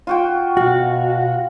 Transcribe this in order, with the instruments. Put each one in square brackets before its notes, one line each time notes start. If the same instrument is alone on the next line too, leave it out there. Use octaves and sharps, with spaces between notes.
[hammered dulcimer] F4 F#4 G5
[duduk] B2 [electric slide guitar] F#4 [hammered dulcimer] F5